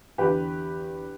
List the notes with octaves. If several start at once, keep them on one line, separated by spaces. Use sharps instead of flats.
E2 D3 G4 B4